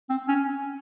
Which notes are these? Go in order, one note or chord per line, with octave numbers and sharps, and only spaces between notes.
C4
C#4